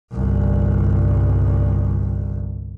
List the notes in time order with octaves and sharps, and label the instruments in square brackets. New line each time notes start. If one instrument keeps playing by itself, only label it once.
[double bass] G1 C2